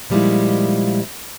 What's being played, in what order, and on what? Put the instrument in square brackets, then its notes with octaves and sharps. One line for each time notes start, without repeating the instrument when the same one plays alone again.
[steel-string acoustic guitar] A#2 F3 G3 G#3 D#4 E4